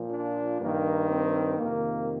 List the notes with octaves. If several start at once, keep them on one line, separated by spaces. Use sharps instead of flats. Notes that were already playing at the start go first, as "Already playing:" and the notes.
Already playing: A#2 F3
D4
G2 D#3 A#3
C4
F2 C3 D#3 A#3